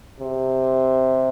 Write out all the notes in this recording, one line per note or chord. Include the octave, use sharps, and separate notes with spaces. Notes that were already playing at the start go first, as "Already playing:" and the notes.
C3